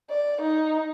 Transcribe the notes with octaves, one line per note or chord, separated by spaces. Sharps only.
D5
D#4